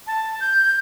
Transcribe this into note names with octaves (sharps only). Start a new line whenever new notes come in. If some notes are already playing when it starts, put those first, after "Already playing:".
A5
G6